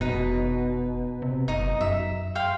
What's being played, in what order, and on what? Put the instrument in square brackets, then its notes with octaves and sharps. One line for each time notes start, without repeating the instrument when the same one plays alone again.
[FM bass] F1 [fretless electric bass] B2 [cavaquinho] D#4 B4
[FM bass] C3
[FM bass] F#1 [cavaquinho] D#4 D#5
[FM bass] F#2 [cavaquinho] E5
[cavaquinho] F5 G5 C6